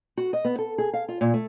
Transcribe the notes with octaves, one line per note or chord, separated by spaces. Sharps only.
F#4
D#5
B3
A4
G#4
F5
F4
A#2
A3